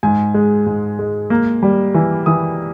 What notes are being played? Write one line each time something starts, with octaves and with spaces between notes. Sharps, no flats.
G#2 G#5
G#3
G#2
G#3
A#3
G3
E3
E3 D#6